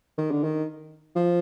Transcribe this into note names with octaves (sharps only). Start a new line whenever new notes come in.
D#3
D3
D#3
F3